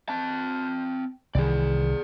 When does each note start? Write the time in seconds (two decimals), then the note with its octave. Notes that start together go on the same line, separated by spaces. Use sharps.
0.09 C4 A5
1.35 C2 D#3 E3 G#4 D5